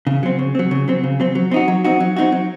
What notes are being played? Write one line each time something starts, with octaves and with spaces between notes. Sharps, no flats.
C#3
F#3 C4
C#3
F#3 C4
C#3
F#3 C4
C#3
F#3 C4
F#3
C4 D#4 F#4
F#3
C4 D#4 F#4
F#3
C4 D#4 F#4
F#3